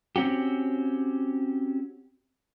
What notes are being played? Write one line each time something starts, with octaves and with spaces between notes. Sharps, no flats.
C4 C#4 F#4 G4